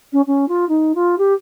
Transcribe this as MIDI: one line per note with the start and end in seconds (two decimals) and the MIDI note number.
0.12 0.21 61
0.26 0.47 61
0.48 0.67 65
0.68 0.94 63
0.94 1.15 65
1.18 1.33 67